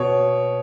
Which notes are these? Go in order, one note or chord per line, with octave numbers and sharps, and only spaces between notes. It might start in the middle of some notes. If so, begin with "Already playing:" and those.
Already playing: B2 C#5